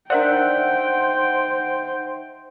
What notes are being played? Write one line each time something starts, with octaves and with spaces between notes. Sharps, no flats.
D4 D#4 A#4 C5 D5 E5 F#5 G5